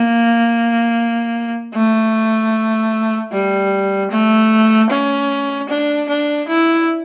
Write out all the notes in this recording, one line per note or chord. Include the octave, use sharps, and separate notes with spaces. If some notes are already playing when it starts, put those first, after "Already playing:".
Already playing: A#3
A3
G3
A3
C#4
D4
D4
E4